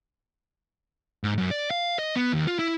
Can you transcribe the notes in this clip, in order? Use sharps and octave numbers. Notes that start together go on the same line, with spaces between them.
G#2
F#2
D5
F5
D#5
B3
D#2
F4
E4